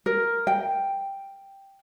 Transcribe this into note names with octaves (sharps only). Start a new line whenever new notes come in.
A#4
G5